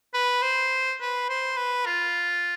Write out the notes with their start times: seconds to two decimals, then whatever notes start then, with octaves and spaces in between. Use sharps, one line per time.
0.14 B4
0.43 C5
1.01 B4
1.29 C5
1.57 B4
1.86 F4